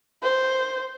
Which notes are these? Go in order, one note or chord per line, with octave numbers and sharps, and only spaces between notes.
C5